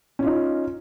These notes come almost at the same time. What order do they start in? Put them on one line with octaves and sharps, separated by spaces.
C#4 F4 D#4